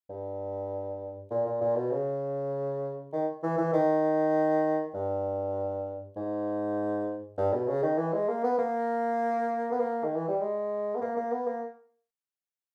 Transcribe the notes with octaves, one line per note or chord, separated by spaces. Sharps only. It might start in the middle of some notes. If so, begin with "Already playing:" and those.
G2
A#2
A#2
A#2
B2
C#3
D#3
E3
E3
D#3
G2
G#2
G2
B2
C#3
D#3
E3
G#3
A#3
B3
A#3
B3
A#3
D#3
E3
G3
G#3
B3
A#3
A#3
B3
A#3